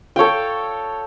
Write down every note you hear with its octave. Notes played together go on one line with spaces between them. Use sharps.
A4 C#5 F5 G5